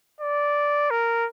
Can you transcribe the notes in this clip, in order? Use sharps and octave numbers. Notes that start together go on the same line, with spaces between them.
D5
A#4